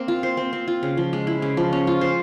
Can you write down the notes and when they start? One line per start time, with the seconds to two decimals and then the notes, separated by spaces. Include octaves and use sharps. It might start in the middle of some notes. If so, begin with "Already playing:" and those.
Already playing: A#3 C4
0.08 F4
0.23 C5
0.37 C4
0.53 C4
0.68 F4
0.83 C#3
0.97 F3
1.13 G#3
1.27 E4
1.42 C#3
1.57 F3
1.73 C#4
1.87 F4
2.01 C5